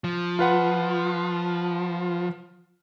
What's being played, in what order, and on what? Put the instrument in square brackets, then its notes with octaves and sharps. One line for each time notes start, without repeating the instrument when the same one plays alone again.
[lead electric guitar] F3
[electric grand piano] F4 B4 F#5